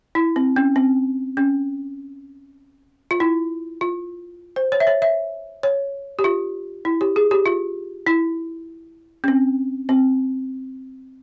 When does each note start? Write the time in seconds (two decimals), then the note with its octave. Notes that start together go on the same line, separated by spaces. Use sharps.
0.15 E4
0.36 C4
0.56 C#4
0.76 C4
1.37 C#4
3.11 F4
3.20 E4
3.81 F4
4.56 C5
4.72 C#5
4.80 E5
4.87 C#5
5.02 E5
5.63 C#5
6.19 G4
6.24 F4
6.85 E4
7.01 G4
7.16 G#4
7.31 G4
7.46 F4
8.07 E4
9.24 C#4
9.28 C4
9.89 C4